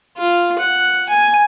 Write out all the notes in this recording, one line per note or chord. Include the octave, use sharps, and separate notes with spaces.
F4
F#5
G#5